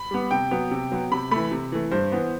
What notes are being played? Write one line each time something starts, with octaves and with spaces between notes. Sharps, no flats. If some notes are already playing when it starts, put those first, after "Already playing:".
Already playing: B5
G3 B3
C3 G5
F#3 B3
C3
F#3 B3
C3 B5
E3 A3 B5
C3
E3 A3
G2 C5
E3 B3